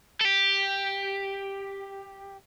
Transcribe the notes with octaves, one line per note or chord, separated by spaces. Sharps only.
A4
G4